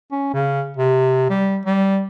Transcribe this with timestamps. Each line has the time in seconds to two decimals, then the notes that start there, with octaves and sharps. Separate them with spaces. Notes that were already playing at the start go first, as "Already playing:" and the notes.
0.12 C#4
0.33 C#3
0.77 C3
1.30 G3
1.65 G3